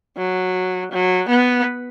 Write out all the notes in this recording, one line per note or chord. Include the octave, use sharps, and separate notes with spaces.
F#3
F#3
B3